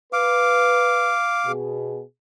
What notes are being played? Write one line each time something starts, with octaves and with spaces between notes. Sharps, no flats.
B4 F5 D6
B2 G#4